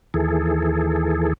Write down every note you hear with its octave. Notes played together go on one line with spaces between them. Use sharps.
D#2 E3 G#4 A4